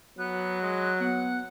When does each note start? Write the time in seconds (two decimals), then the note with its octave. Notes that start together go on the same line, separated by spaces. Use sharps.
0.18 F#3 B3 F#6
0.61 G#3
1.01 B3 F#5